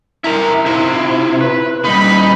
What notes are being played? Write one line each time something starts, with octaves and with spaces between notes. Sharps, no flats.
E4 A#4 E5 A#5
C3 E4 F4
B4
A#2 G3 D#4 B5